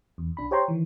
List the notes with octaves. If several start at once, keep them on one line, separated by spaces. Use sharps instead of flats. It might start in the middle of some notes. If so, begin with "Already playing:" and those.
E2
B1 D4 B5
G4 C5 C#5 G5 A#5 C6
D#3 E3